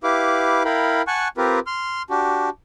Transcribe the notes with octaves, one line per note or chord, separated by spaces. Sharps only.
E4 G4 B4 F5 D6
E4 A#4 F5 G5 B5
F#5 G#5 A5 C#6 F#6
C4 F4 G4 A#4 B4
C6 F6
D4 F#4 G4